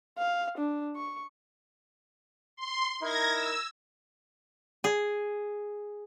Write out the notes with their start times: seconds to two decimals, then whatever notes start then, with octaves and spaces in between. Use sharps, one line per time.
0.18 F5
0.58 D4
0.96 C#6
2.56 C6
3.02 D#4 E4 A#4 G#6 A#6
3.33 E6
4.84 G#4